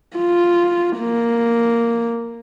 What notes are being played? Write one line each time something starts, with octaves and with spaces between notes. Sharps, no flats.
F4
A#3